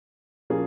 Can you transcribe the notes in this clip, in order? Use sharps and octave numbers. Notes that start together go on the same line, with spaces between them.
A#2 F3 A#3 C#4 G#4